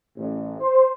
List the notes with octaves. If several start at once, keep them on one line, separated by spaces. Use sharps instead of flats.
A1
C5